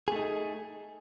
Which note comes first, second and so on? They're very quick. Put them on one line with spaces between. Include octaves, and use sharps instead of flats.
G#4 A3 D#4